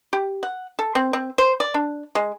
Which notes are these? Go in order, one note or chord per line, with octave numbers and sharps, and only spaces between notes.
G4
F#5
A4
C4
C4
C5
D5
D4
G#3